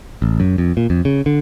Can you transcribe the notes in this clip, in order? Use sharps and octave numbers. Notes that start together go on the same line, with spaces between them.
A1
F#2
F2
A#2
F2
C#3
D3